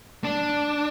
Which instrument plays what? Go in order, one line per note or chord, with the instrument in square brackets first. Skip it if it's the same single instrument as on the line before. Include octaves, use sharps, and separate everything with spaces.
[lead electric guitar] D4